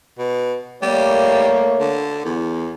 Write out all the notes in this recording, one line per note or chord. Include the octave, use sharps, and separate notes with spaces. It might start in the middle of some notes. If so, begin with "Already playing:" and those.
B2
G3 A3 A#3 C#5
D3
E2